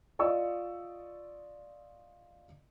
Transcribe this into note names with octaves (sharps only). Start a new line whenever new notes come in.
F4 D5 D#5 C#6 D#6 E6